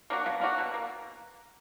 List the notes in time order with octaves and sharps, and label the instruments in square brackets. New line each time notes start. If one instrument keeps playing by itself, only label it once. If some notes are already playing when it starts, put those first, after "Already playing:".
[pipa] A#3 D4 F#4
[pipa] B2 [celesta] F5
[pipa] A#3 D4 F#4 [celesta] F5
[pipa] B2
A#3